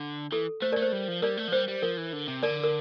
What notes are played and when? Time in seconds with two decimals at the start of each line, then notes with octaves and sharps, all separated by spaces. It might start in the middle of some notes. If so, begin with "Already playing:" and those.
Already playing: D3
0.32 E3 A4
0.62 A3 C5
0.72 A#4 D5
0.77 A3
0.82 C5
0.92 G3
1.08 F3
1.22 G3 A#4 D5
1.37 A3
1.48 F3
1.52 G3 C5
1.68 G3
1.82 F3 A#4
1.97 E3
2.13 D3
2.28 C3
2.43 D3 A#4 D5
2.64 A#4